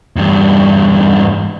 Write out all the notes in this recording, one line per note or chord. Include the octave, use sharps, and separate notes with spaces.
E2 G2